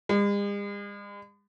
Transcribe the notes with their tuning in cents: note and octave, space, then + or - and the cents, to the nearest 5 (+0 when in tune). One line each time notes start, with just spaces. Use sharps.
G#3 -45